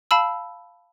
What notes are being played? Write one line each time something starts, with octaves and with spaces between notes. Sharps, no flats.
F5 A5 B5 E6